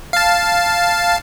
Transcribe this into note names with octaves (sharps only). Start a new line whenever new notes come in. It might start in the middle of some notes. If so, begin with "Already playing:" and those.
F5 A5